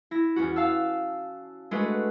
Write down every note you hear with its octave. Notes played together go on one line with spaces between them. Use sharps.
E4 A#6
E2 C#4 F#4
F5 A5 E6
G#3 A3 D4 F#4 B4